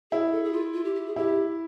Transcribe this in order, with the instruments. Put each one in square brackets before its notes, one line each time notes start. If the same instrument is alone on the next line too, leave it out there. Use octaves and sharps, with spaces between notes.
[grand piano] E4 [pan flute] G#4
[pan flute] A4
G#4
F4
F4
G4
G4
G#4
[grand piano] E4 [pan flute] G4